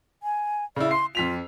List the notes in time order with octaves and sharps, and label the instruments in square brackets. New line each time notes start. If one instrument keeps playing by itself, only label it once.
[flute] G#5
[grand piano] C#3 E4 [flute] D5
[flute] C6 [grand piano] C7
[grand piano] F2 B6 F7 [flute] F4